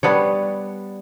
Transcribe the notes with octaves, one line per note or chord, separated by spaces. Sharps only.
G3 B3 D4 C#5